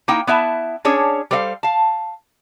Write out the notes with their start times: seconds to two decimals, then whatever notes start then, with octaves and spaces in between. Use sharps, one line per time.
0.08 A#3 D#4 E4 G5
0.27 B3 E4 E5 A5
0.85 C#4 D4 G#4 C#5
1.31 G3 A4 C5 D#5 F5
1.63 F5 A5